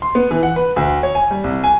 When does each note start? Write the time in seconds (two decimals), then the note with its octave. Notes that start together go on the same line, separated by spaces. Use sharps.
0.02 C6
0.15 B3
0.31 E3
0.43 F#5
0.56 B4
0.76 D2
1.03 C#5
1.15 G#5
1.31 G3
1.44 C2
1.64 G#5